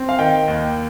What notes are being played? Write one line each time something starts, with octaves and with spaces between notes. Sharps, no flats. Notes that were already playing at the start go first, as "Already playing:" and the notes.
Already playing: C4
F5
D#3 G5
D#2